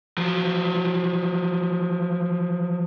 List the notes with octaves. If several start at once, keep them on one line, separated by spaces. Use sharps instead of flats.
F3 F#3